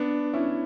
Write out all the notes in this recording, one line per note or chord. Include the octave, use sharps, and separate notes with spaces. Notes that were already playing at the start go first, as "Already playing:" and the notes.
Already playing: B3 D4
C#4 E4